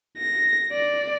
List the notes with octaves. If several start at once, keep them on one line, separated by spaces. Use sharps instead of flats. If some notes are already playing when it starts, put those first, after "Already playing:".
A#6
D5